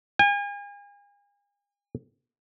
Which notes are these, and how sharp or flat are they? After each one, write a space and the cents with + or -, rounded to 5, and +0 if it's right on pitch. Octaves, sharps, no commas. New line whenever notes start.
G#5 -40